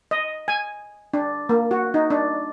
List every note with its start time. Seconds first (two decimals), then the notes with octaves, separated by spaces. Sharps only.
0.11 D#5
0.48 G#5
1.14 D4
1.49 A#3
1.71 F#4
1.94 D#4
2.10 D4